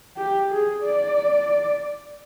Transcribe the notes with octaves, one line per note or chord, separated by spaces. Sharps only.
G4
G#4
D5